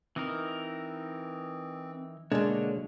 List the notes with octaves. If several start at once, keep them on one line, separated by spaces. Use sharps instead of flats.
E3 C4 D#4 A#4
B2 D3 G#3 A#3 D4 C#5